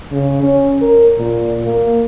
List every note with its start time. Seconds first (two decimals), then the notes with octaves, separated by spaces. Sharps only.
0.12 C#3
0.43 C#4
0.82 A#4
1.17 A#2
1.65 A#3